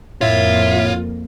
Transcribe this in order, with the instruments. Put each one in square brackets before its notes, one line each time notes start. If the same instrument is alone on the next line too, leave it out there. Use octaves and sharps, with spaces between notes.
[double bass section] F2 A#3 [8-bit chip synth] A2 C#5 [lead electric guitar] F4 [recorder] E5